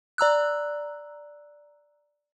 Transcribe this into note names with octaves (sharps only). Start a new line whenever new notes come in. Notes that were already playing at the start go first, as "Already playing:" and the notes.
D5 A#5 E6 F#6